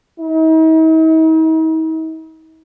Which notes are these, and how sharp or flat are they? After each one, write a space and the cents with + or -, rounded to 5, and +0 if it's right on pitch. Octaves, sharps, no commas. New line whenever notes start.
D#4 +45